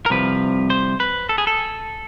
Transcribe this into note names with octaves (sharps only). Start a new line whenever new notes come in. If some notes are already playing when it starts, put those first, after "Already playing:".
A#4
C2 C3 F3 B4
C5
B4
A4
G#4
A4